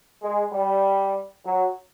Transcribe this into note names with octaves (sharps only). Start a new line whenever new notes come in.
G#3
G3
F#3